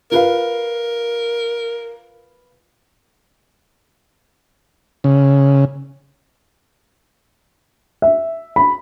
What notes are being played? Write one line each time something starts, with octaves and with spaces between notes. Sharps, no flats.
F4 A#4 B4 F5
C#3
E5
B5